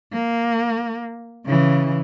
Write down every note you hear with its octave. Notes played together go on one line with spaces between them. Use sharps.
A#3
C#3 E3